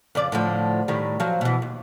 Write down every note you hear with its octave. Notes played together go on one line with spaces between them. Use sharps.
F2 C#3 D5
A2 D3 F3
A2 D#3 G3
F3 F#3
B2 E3
D#2